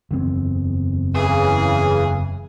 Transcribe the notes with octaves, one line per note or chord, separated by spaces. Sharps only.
F#1 E2 C4
C#3 E3 G#4